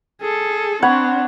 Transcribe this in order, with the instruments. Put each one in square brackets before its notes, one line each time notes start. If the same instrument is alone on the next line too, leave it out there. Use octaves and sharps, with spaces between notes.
[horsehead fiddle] G#4 A4
[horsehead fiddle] C4 D4 [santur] C#5 F#5 B5